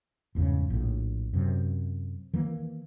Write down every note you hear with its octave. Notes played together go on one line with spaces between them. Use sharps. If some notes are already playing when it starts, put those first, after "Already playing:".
G1 E2 G#2 C#3
A#1 A2
F#2 C3
D#3 E3 A#3